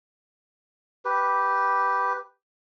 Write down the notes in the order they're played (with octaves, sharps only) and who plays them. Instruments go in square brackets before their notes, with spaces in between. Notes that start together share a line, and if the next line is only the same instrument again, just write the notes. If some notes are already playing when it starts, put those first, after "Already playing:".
[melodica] G4 B4